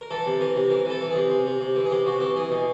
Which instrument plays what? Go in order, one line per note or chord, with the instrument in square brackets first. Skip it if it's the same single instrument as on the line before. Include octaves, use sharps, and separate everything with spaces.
[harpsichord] A#4
E3 A4
C3
E3 A#4
C3
E3 A#4
E3 A4
E3
C3 G#4
C3
C3
C3
E3
G#4
C3 G4
C3 F#4
E3 G4
E3 G#4
B2